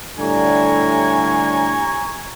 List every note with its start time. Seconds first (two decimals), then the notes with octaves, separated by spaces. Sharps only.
0.19 A2 D3 G3 G#5 A#5 C#6